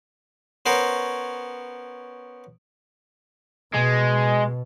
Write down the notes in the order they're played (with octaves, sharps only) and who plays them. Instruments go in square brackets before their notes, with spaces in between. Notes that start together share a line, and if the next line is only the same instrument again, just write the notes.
[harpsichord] B3 C#4 A#4 C5 C#5
[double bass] B2 [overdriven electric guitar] G#3